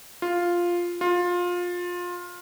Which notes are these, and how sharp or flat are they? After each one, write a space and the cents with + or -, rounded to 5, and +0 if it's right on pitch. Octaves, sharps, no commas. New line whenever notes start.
F4 +0
F4 +20